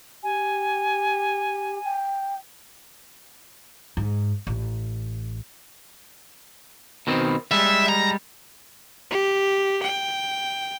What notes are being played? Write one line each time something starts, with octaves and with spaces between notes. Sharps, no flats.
G4 G#5
G5
G#2
A1
B2 D#3 C4
G3 G#3 E5
A#5
G4
G5